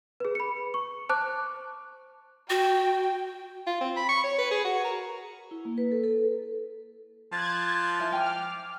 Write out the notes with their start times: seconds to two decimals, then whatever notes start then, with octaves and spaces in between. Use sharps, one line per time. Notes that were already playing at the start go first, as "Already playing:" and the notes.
0.20 G#4 B4
0.35 B5 C#7
0.74 C#6
1.09 C5 A5 D6 F#6
2.50 F#4 G5
3.67 F4
3.81 C4
3.96 B5
4.09 C#6
4.24 C#5
4.38 B4
4.51 G#4
4.64 F#4
4.84 A#4
5.51 E4
5.65 A#3
5.78 B4
5.91 A4
6.04 A4
7.32 F3 F#6 G#6 A6
8.00 E4 A#4 G#5
8.12 G5 G#5 D6 F6